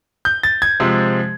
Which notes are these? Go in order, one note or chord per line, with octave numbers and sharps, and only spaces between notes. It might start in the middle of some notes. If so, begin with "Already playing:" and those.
G6
A6
G#6
C3 F3 G#3